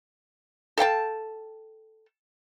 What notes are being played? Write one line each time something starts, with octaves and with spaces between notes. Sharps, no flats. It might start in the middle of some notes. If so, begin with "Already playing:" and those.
A4 F5 G5 A5